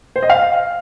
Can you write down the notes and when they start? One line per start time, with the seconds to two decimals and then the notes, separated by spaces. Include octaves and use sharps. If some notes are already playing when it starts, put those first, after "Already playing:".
0.16 C5
0.23 D#5
0.30 F5